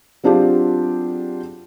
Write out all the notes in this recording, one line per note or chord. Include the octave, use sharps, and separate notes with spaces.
F#3 C4 D4 F4 G4 G#4